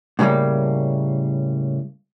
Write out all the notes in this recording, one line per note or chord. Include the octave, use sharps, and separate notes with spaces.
A2 C#3 F#3 G3 A#3